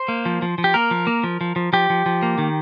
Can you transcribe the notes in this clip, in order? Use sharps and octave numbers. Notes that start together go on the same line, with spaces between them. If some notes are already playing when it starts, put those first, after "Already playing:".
Already playing: C5
A#3
F3
F3
F3
G4
A#3 A#4
F3
A#3
F3
F3
F3
F3 G4
F3
F3
A#3
D#3